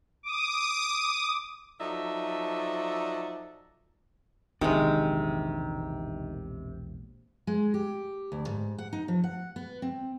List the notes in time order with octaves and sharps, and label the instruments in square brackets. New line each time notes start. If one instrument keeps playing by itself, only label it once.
[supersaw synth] D6 D#6
[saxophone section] F3 F#3 D#4 A4 D5 E5
[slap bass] E1 A#1 D4 [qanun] C3 G#3 [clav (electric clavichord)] D#3
[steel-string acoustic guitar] G#3
G4
D2
G#2
F#5
D#4
F3
F#5
B3
C4